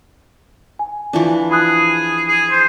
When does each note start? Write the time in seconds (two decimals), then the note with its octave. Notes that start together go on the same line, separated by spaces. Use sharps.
0.79 G#5
1.13 E3 F3 D4
1.51 G#4 B5 D#6 F#6
2.28 G#4
2.51 C5